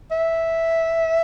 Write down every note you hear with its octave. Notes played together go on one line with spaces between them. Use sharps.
E5